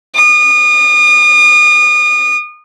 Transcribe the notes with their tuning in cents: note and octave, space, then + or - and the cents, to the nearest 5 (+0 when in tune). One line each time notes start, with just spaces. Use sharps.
D#6 -35